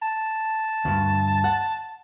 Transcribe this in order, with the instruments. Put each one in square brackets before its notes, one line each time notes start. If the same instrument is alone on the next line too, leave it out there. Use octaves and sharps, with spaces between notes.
[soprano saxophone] A5
[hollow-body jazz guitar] D2 G2
F#5